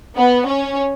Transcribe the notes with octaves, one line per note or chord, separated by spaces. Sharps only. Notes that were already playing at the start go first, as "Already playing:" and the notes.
B3
C#4